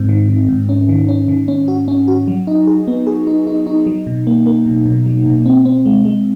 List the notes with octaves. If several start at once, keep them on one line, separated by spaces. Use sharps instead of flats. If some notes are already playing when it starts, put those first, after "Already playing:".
Already playing: G#2 C4
D#3
D#3
G#2
C#4
D#3
C#4
D#3
C#4
F#4
C#4
F#4
F#3
D#4
G#4
B3
G#4
D#4
D#4
D#4
F#3
B2
A#3
A#3
B2
B2
F#3
B2
C4
C4
G#3
G#3